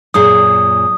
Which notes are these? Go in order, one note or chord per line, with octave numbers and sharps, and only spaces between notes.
F#2 A#2 G#4 D#6